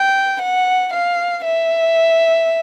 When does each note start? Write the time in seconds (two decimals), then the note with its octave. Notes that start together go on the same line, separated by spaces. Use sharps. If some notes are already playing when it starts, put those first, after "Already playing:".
Already playing: G5
0.41 F#5
0.93 F5
1.45 E5